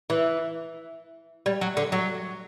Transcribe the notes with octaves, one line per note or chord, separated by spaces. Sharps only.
E3
G3
F#3
D3
F#3